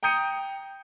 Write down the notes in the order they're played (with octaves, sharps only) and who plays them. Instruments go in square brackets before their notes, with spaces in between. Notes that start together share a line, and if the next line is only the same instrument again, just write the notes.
[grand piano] G5 A#5 D#6 G6 C#7 D#7